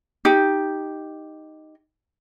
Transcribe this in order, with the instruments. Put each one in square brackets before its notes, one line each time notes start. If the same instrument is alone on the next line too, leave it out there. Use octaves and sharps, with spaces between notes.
[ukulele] D#4 G4